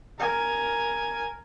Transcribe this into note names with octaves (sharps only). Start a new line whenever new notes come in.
A#4 G#5